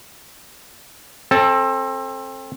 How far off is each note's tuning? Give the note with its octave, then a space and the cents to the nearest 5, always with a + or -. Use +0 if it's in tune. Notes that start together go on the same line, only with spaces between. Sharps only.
C4 +25 A4 +0